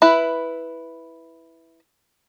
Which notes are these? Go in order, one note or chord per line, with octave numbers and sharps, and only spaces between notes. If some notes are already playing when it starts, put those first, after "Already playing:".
E4 B4